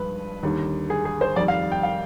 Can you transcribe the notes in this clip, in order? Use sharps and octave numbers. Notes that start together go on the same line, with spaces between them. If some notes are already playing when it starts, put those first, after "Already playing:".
Already playing: G2 F3 G#3 B4
D#2 D3 G3
G#4
G#4
C5
F2 D#3 G3 D5
F5
G5
F5